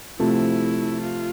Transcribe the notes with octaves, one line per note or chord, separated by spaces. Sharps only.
C3 F3 A3 E4
F4